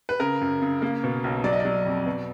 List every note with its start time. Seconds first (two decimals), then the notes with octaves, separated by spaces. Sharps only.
0.09 B4
0.20 C#3 A#4
0.41 F#2
0.62 C#3
0.82 A#3
1.04 B2
1.24 B1
1.44 F#3 D5
1.53 D#5
1.60 F#3 D5
1.85 F2
2.06 B2